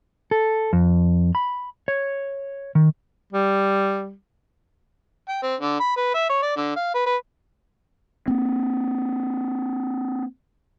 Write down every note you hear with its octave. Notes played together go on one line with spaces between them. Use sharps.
A4
F2
B5
C#5
D#3
G3
G5
C4
D3
B5
B4
E5
C#5
D5
D3
F5
B4
B4
A#3 C4